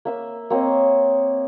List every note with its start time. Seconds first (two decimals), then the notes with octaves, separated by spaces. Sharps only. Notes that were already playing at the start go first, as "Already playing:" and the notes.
0.05 A#3 E5 E6
0.50 A#3 C4 C#5 D#5